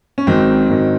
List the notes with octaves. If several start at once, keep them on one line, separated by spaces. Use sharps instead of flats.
C#4
G#1 G#2 D#3 F#3 C4
G#1 G#2 D#3 F#3